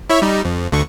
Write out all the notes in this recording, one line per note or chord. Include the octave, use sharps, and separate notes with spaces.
E4 C#5 E5
G3 D#4
F2
D2 D3 C#6